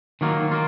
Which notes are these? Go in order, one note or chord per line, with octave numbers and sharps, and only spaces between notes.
D#3 F#3 A#3 F4
A#3 F4